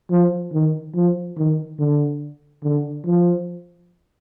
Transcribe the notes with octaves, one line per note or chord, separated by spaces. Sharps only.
F3
D#3
F3
D#3
D3
D3
F3